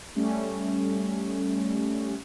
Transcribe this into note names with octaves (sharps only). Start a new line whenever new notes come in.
G3 A3 C#4